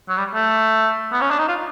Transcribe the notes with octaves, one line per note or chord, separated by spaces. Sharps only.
F#3
G3
A3
B3
C#4
D4
D#4
F4